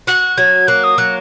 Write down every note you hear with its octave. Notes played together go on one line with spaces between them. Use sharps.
F#4 F#6
F#3 G#6
A#3 F#6
D#6
F#3 F#6